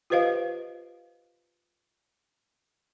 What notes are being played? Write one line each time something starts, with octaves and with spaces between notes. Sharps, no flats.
F4 G4 B4 C5 D#5 F5